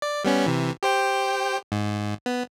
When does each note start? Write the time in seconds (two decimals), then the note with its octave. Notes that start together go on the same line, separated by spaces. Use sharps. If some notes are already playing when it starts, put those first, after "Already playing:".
0.02 D5
0.24 G3 B3 C#4
0.46 C3 E3
0.83 G4 C5 G5
1.72 G#2
2.26 B3